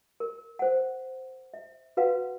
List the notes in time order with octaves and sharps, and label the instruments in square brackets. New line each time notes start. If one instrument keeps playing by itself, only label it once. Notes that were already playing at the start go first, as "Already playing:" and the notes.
[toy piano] A#4
C5 F#5
E5
F#4 B4 F5 F#5